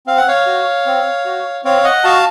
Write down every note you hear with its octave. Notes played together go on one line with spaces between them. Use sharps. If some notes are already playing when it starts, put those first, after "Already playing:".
C4 F5
F#5
C#5 F5
F#4
C4
F#4
C4 C#5 F5
D#5 F#5
F#4 F5 A5